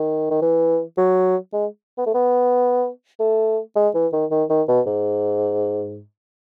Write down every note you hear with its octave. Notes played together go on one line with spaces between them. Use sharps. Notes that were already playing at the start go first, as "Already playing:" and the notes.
Already playing: D#3
D#3
E3
F#3
G#3
B3
A3
B3
A3
G#3
E3
D#3
D#3
D#3
B2
G#2